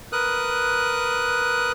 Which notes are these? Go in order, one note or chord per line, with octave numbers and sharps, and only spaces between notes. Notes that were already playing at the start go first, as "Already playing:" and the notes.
A#4 B4 D#6 F#6